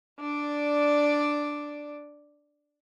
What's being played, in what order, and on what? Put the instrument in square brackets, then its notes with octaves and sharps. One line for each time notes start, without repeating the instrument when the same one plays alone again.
[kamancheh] D4 D5